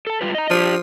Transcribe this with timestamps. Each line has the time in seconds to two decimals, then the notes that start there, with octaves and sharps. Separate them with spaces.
0.07 A4 A5
0.21 G3 F4 B4
0.35 D#5 A#5
0.50 F3 D4 G4